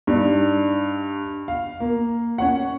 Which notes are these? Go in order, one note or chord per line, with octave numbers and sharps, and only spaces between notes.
G2 D4 D#4
F5
A#3
C#4 C#5 F#5